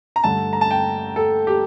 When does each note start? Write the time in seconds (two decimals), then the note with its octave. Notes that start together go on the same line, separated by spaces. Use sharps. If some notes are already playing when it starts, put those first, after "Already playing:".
0.16 A#5
0.24 G2 D3 A3 A5
0.53 A#5
0.61 A5
0.71 G5
1.16 A4
1.47 G4